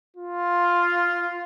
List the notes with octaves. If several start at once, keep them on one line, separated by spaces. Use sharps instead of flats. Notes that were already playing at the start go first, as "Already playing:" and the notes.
F4